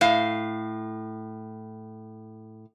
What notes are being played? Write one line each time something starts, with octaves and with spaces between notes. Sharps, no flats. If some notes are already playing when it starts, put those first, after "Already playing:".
A2 F5